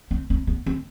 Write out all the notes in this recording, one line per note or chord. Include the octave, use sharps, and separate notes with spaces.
C4
C4
B3
C4